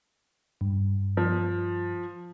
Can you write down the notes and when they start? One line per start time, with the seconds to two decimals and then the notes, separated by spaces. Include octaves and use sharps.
0.61 G2
1.17 F3